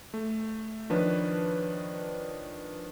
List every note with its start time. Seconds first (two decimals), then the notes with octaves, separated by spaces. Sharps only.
0.14 A3
0.90 D#3 F3 D4 B4 C#5